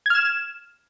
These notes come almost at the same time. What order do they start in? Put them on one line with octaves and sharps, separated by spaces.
G#6 F6 E7